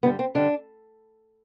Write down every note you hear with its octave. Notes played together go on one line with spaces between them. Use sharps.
G2 D3 G3 B3
C4
G2 D3 G3 D4